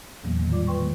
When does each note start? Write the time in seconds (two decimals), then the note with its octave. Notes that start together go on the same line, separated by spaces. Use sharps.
0.24 E2 A#2 E3 F#3 A#3 B3
0.39 A2 D#3 A#3
0.51 G3 F4 D5 D6
0.67 F4 B4 G5 C6 C#6
0.79 D#3 G#3 A#3